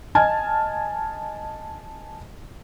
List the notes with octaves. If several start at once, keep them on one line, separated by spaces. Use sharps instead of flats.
D#5 G#5 A5 F6 G#6